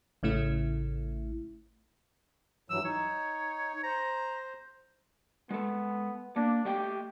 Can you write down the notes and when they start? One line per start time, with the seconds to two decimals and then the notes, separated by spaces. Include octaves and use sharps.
0.23 A1 C#3 A3 E4
2.70 G2 E3 F#3 E6
2.85 D#4 C#5
3.83 C5 A#5
5.51 G#3 B3 A4
6.36 A#3 D4
6.65 A3 G4 D#5 G5